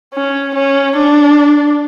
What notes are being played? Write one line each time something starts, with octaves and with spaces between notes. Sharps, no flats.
C#4
C#4
D4